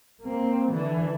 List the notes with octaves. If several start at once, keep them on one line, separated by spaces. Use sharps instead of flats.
A#3 C4
D3 E3